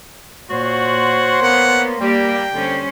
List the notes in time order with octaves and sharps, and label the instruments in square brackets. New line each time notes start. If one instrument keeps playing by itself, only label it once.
[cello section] A#2 [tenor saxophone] F#4 [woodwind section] C5 C#5 C6 [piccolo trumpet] F#5
[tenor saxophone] A#3 [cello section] B3 [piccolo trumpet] F#5
[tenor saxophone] G3 [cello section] A#3 G4 D5 [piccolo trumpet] G5
[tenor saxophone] D3 [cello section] G3 C#4 C5